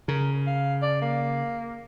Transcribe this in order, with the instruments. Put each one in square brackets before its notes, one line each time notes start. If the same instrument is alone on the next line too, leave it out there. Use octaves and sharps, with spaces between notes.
[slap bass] C#3 [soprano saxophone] A#4
[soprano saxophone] F5
D5
A#3